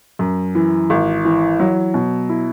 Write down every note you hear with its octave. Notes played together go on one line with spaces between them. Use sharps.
F#2
E3
G#1
E3
F#3
B2
E4